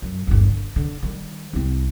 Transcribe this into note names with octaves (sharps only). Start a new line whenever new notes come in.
F#2
G1 D#2
D3
D3
D#3 G3
C2 C4